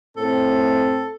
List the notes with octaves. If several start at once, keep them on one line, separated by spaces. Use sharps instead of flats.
A2 C4 A4